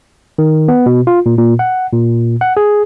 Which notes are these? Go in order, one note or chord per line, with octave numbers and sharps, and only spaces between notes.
D#3
B3
B2
F4
A#2
A#2
F#5
A#2
F#5
G#4